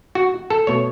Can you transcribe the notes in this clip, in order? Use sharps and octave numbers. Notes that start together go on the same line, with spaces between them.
F#4
A4
B2 A3 C#5